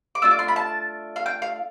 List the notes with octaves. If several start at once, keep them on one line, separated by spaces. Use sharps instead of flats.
D6
A3 D4 F4 E6
D6
C6
B5
A5
F5
G5
F5